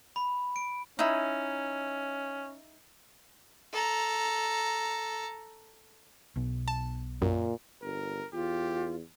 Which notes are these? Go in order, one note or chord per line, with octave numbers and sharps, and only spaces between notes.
B5
D7
C#4 D#4 E4
A4 A#5
B1 B2
A5
F#2 A#2
G1 A#4
E2 F4 G4